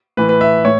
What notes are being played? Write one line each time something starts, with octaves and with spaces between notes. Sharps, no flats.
A2 E3 B4
B4
E5
A2 C#5